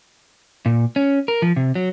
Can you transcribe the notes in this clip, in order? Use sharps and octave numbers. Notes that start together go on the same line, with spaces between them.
A#2
C#4
A#4
F3
C3
F#3